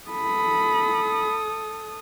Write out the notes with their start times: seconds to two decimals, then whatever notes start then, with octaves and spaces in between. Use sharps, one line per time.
0.11 A4 B5 D#6